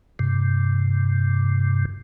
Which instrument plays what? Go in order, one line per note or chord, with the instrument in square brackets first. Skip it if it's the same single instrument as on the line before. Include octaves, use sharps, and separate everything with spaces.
[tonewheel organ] G2 C3